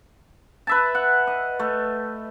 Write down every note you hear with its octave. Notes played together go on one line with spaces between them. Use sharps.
B4 E5 A5
F#5
D#5
A3